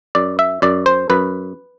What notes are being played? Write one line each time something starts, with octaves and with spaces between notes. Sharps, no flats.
F#2 D5
E5
F#2 D5
C5
F#2 B4